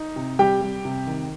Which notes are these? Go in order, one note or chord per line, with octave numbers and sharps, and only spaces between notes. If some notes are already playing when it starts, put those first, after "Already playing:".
Already playing: D#4
C3
G3 G4 G5
G3
C3
D#3